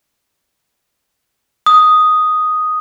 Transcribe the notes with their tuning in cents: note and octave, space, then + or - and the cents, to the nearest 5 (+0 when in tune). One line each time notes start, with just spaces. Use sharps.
D#6 +0